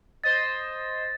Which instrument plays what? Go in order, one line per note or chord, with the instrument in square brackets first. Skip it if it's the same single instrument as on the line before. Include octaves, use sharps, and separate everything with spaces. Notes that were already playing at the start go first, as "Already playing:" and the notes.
[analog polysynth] C5 D#5 [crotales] A6